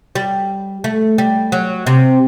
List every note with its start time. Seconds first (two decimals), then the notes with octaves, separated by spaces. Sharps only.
0.15 G3
0.84 A3
1.18 G3
1.52 F#3
1.86 C3